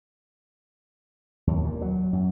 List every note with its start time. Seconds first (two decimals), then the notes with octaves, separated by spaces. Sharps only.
1.47 D#2
1.65 A#2
1.81 F#3
2.13 F#2